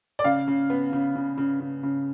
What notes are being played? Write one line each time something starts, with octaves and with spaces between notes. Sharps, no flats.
D5
C#3 F5
C#3
B3
C#3
C#3
C#3
C#3
C#3